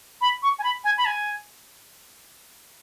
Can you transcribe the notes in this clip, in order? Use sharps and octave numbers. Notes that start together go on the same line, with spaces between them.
B5
C#6
G#5
B5
G#5
B5
G#5